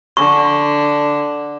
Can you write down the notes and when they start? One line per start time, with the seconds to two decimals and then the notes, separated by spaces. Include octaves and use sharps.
0.17 D3 C#6